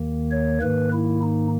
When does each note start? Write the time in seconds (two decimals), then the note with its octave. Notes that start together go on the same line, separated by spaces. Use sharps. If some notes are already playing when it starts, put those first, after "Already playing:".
Already playing: D#2 D#3 A#3
0.31 C#5
0.61 G#2 D#3 A#3 B4
0.93 E4
1.23 D#4